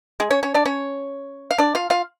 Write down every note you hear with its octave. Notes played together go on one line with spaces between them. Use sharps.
G#3 G#4
C#4 C#5
C#4 C#5
D4 D5
C#4 C#5
F5
D4 D5
F4 F5
F4 F5